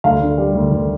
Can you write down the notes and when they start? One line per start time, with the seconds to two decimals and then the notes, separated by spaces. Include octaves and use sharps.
0.04 D2 F5
0.21 D3
0.38 G3
0.55 D2
0.71 D2